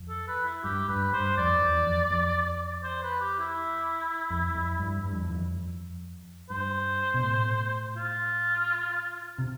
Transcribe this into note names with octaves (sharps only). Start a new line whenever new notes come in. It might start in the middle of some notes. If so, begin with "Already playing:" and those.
Already playing: F2
A4
B4
E4
G2 G4
G2 B4
G2 C5
F2 D5
E2
F2
F2
C5
B4
G4
E4
F2
F2
G2
G2
F2
E2
F2
G2 C5
B2
A2
F4
C3